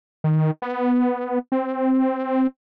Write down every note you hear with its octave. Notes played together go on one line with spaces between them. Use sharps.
D#3
B3
C4